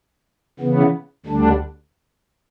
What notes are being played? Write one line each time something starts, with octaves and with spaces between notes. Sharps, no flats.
C#3 E3 B3
D2 D3 G3 D4